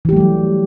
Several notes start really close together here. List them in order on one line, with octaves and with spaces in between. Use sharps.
E3 G4 A3 G3 F#3